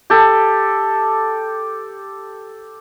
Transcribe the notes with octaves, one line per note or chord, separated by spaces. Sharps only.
G4 A4